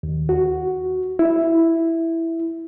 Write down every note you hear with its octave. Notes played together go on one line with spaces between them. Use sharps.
D#2
F#4
E4